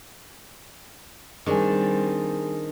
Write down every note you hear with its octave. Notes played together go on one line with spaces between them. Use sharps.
D#3 G3 C4 D4 G#4 G#5